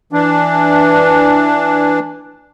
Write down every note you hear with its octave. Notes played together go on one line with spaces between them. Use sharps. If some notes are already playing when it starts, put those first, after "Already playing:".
E3 D4